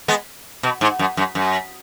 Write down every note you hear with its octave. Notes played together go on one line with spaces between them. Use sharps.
G#3 B3
B2
G#2
F#2
F#2
F#2